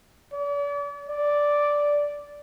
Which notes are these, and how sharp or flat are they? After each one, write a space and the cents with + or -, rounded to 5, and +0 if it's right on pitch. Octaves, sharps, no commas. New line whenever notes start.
D5 -40
D5 -5